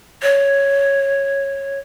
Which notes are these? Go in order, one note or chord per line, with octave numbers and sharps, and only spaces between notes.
C#5